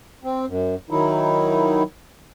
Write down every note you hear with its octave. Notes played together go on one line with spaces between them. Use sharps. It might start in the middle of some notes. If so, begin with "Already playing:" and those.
C4
F#2
D#3 F#3 D#4 E4